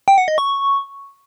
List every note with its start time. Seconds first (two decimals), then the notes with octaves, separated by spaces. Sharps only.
0.08 G5
0.18 F#5
0.28 D#5
0.38 C#6